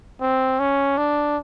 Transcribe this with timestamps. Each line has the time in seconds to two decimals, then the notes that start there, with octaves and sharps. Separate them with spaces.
0.21 C4
0.60 C#4
0.98 D4